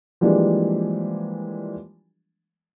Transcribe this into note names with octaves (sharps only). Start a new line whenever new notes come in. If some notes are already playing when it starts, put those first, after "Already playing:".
E3 F3 G3 G#3 A#3 D4